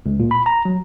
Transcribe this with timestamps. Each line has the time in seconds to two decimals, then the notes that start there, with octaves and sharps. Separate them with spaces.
0.06 C#2
0.20 A#2
0.31 B5
0.46 A#5
0.65 F#3